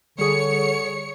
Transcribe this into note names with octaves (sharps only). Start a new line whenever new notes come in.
D3 G3 G#4 C#5 C#7